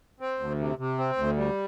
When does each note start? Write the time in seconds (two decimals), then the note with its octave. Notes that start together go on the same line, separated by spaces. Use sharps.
0.20 C4
0.40 D2
0.59 C3
0.78 C3
0.98 C4
1.17 D2
1.37 G3